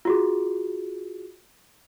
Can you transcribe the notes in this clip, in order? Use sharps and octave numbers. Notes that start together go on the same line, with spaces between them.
F4 F#4 G#4